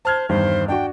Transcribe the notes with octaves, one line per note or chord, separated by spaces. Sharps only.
C5 A5 F6 G#6
E2 G2 D#3 C5
D4 F#4 G5